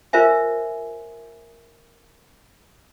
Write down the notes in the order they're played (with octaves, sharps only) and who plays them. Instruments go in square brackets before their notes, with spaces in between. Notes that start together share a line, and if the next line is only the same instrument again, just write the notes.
[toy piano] F4 A#4 C5 E5 G#5